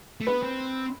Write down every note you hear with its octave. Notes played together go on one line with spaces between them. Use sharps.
A3
B3 B4
C4